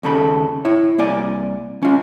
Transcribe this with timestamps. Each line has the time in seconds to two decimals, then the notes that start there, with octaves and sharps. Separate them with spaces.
0.03 D#2 C#3 A4 B5
0.65 E4 C#5
0.98 C2 A#3 D5 G#5
1.82 C#4 F4